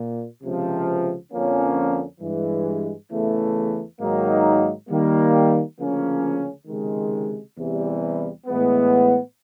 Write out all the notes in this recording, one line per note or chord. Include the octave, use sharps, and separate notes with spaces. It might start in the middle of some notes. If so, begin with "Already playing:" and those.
Already playing: A#2
C#2 C3 F3
F2 D3 F3 A#3 C#4
G2 E3 G#3
E2 C#3 E3 A3
G#2 D#3 F#3 A#3 D#4
D#3 G3 A#3
D2 C#3 F3 A#3 C#4
C#2 C3 D#3 G#3
E2 C3 E3 G3
A2 E3 G#3 B3